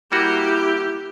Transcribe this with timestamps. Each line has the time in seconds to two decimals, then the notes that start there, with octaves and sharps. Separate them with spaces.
0.12 G3 A#3 E4 F#4 G4